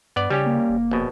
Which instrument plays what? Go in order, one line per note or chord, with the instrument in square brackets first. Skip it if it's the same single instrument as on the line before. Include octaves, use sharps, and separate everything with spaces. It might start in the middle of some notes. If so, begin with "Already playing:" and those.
[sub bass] G2 [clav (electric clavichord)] B3 D5
[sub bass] C#3 [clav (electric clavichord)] G3 C#4 G4
[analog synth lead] A#3
[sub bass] F1
[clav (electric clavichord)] A#1 B2